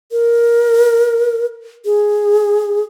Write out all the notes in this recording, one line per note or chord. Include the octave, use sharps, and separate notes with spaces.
A#4
G#4